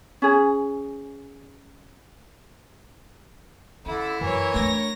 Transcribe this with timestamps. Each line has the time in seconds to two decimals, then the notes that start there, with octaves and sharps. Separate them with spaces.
0.22 C#4 G#4
3.86 D3 C#4 E4
4.21 F#2 E3 A#4 C#5
4.54 A3 D4 A#6